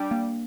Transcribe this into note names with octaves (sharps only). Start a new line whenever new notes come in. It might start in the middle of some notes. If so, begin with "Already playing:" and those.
Already playing: G3 D4
A#3